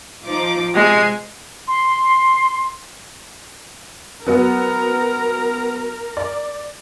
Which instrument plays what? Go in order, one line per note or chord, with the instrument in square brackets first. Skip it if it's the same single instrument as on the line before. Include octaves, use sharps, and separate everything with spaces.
[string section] F3 D#4 D6
[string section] C3 G#5 C7 [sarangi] G#3
[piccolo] C6
[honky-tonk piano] F#3 B3 F#4 [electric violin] A#4
[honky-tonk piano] D5